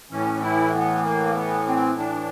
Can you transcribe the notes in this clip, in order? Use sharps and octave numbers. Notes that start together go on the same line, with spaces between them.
A2 E3 C#4
E4
B3
A#3
B3
C4
D4